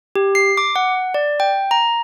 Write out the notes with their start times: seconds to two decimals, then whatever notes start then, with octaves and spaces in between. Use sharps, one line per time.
0.16 G4
0.35 C7
0.57 D6
0.76 F#5
1.14 D5
1.40 G5
1.71 A#5